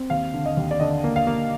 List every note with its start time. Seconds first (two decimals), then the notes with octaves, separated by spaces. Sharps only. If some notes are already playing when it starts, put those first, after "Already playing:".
Already playing: C4
0.10 D#2 F5
0.34 D3
0.46 D#5
0.57 D#2
0.71 D5
0.80 D3 D#5
1.04 A#3
1.16 F5
1.27 A#3